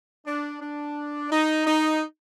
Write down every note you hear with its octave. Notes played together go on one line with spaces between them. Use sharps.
D4
D4
D#4
D#4